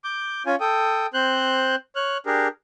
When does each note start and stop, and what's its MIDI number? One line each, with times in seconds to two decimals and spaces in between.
0.04 0.43 86
0.04 0.43 91
0.46 0.56 61
0.46 0.56 65
0.46 0.56 80
0.60 1.07 69
0.60 1.07 79
0.60 1.07 87
1.14 1.75 60
1.14 1.75 72
1.14 1.75 90
1.14 1.75 91
1.96 2.18 73
1.96 2.18 89
1.96 2.18 90
2.26 2.48 62
2.26 2.48 67
2.26 2.48 68
2.26 2.48 70